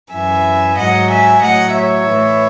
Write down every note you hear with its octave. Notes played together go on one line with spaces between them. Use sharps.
F#2 E3 E5 G#5
G#2 F#3 D#5 F#5
E5 G#5
A2 F#3 D#5 F#5
C#5 E5
A2 E3